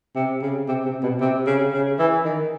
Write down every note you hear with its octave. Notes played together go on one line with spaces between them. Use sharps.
C3
C#3
C3
C3
B2
C3
C#3
C#3
E3
D#3